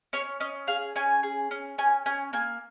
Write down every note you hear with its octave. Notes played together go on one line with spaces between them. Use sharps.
C#4 C#5
C#4 D#5
G#4 F5
C#4 G#5
G#4
C#4
C#4 G#5
C#4 G#5
A#3 G#5